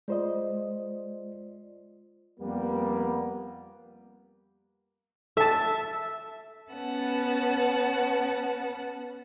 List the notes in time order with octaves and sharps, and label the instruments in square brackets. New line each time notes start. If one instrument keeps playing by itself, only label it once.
[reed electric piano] G#3 C5 D#5 [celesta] F4 D5
[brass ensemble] F2 G3 A#3 B3
[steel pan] A4 A5 [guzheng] E5
[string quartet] B3 C#4 B4 F#5 A5